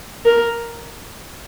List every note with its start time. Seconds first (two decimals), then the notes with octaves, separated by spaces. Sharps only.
0.25 A#4